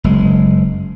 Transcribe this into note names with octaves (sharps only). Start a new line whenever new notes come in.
F#1 G#3